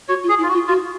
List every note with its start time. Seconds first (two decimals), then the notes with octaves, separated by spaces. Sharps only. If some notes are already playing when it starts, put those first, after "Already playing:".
0.09 F#4 C#5
0.23 F4
0.29 G#4
0.38 E4
0.43 F4
0.48 F#4
0.53 F4
0.68 F4 F#4